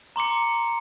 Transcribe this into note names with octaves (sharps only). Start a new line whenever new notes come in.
A#5 C6 D6 C#7